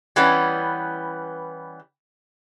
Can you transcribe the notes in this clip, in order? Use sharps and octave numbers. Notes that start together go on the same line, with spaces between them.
E3 G3 B3 C#4